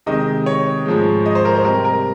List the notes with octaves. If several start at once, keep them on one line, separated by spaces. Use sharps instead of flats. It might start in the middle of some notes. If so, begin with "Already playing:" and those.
C3 D#3 G#3 D#5
C#5
G#2 F3 G#3
D#5
C5
A#4
C5
C3 G3 A#4
A#4